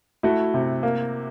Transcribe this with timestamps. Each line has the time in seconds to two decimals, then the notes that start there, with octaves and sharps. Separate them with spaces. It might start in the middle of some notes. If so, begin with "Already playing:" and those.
0.23 A3 E4 F#4
0.54 C3
0.83 A#3